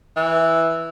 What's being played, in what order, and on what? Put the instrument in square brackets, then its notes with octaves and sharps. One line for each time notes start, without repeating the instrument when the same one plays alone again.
[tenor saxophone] E3